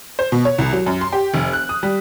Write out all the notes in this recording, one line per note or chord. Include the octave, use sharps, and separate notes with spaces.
C5
B2
C#5
C2
F#3
F#2
C6
G4
F1
F#6
D#6
G3